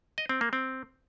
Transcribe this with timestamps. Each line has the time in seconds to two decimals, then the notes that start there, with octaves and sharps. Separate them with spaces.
0.18 D#5
0.29 C4
0.41 A#3
0.53 C4